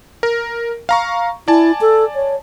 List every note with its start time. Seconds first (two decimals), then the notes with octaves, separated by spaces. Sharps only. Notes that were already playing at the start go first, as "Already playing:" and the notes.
0.23 A#4
0.89 F5 A#5 C#6
1.48 E4 D5 G#5 A5
1.81 A4
2.15 C#5